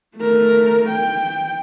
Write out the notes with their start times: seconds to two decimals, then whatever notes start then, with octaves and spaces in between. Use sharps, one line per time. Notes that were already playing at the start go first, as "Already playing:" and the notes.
0.17 A3 A#4
0.89 G5